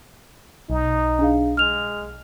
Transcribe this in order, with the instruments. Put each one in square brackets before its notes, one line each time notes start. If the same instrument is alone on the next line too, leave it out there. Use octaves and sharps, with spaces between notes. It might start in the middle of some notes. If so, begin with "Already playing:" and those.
[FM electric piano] B1 [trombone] D#4
[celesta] D4 G#4 F5
[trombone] G#3 [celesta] F6 F7